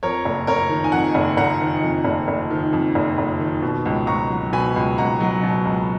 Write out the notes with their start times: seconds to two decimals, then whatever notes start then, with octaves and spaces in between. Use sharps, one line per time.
0.03 F2 A#4 C#5
0.25 F#1
0.47 F#1 A#4 C#5
0.69 D#3
0.84 G#5
0.92 F2 F#5 A#5
1.15 F#1
1.37 F#1 F#5 A#5
1.61 D#3
1.83 F2
2.05 F#1
2.28 F#1
2.51 D#3
2.73 F2
2.95 F#1
3.18 F#1
3.40 D#3
3.62 B2
3.86 C#2
4.07 C#2 A#5 C#6
4.30 F#3
4.53 B2 G#5 B5
4.76 C#2
4.98 C#2 F#5 A#5
5.21 F#3
5.43 B2
5.65 C#2